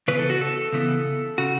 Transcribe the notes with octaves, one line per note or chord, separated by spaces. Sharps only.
C#3 E3 B3 B4
A4
F#4
A4
C#3 E3 B3
C#3 F#4